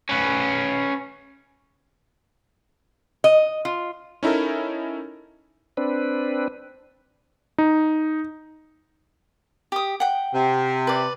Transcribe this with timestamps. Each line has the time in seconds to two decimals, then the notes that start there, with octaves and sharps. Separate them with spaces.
0.09 C#4 B4
3.24 D#5
3.65 F4
4.23 C#4 D#4 E4 A4 A#4
5.77 C4 D4 B4
7.58 D#4
9.72 G4 D#6
10.00 F#5 G5
10.33 C3
10.87 B4 D5